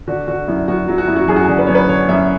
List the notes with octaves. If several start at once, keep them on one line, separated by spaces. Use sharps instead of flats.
D3 F#4
D3 F#4
F#2 E4
F#2 F#4
F#3
F#4
F#2 E4
F#4
F#2 G#4
F#4
D3 G#4
B4
F#2 C#5
B4
D3 C#5
F#2 E5